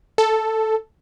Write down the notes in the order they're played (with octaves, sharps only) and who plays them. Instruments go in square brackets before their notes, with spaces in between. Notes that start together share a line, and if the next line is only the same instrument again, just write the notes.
[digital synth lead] A4